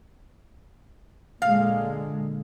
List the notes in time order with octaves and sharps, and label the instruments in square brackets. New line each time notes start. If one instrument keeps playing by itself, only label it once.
[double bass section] A#2 D3 G#3 [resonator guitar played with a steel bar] F5